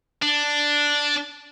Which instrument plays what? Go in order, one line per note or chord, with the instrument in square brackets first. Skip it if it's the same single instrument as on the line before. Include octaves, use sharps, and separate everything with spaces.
[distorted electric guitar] D4